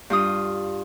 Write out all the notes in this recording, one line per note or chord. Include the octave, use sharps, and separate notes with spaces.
G2 F4 D#6